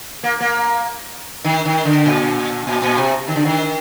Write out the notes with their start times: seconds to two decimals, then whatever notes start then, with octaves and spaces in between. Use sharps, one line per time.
0.23 A#3
0.41 A#3
1.44 D#3
1.65 D#3
1.85 D3
2.06 A#2
2.67 A#2
2.82 A#2
2.97 C3
3.28 D#3
3.36 D3
3.45 D#3